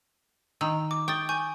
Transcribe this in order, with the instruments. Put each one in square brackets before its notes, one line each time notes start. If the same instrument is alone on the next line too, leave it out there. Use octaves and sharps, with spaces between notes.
[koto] D#3 [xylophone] A#5 E6
[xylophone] D6
[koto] G5 [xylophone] C#6 D#6 A6
[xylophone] G#5 C#6 G6